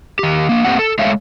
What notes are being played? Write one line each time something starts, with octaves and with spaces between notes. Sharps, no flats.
D#3 G4
A#3 D4
A3 A#3 C4 G4 D5 F#5
A4
G#3 A3 C#5 E5 F5